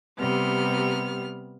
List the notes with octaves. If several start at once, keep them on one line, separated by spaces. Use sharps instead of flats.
C3 G3 B3 F6